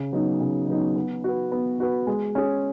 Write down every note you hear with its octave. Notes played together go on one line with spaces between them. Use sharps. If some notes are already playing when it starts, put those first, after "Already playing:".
Already playing: C#3
F#3 B3 D#4
C#3
F#3 B3 D#4
B3
F#4 B4
B3
F#4 B4
G#3
C#4 G#4